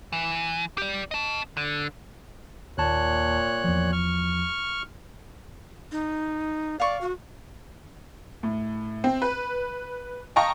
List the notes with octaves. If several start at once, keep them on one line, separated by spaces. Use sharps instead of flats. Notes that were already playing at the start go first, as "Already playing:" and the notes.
E3
G4 D5
D#5 A5
D3
D#2 A#2 C#5 A5 F#6
E2 F3
C#6 F6
D#4
D5 F5 C#6
F#4
A2
C4
B4
D#5 F5 G5 A5 A#5 C#6